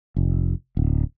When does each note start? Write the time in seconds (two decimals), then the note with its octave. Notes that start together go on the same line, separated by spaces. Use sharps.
0.16 F1
0.77 D1